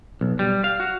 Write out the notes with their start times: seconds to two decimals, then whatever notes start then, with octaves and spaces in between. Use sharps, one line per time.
0.21 B1
0.39 G3
0.64 F5
0.80 F#4